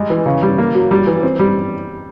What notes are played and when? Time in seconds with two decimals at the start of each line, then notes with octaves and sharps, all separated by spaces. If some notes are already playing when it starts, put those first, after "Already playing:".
Already playing: G3 G#3
0.10 E3
0.26 C#3
0.42 G3
0.58 A#3
0.75 F#3
0.91 G3
1.07 E3
1.23 C4
1.39 G3